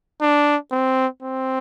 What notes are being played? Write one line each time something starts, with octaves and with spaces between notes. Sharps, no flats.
D4
C4
C4